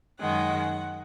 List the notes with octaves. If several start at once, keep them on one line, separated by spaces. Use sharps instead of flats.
F#2 D#3 G#3 F#5